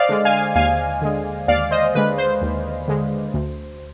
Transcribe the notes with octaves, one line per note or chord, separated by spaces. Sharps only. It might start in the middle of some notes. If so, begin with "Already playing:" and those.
Already playing: C5 D5 D#5 F5
D3 G#3
F5 G#5
D#2 F5 G#5
D3 G#3
D#2 D5 F5
C5 D#5
D3 G#3 B4
C5
D#2
D3 G#3
D2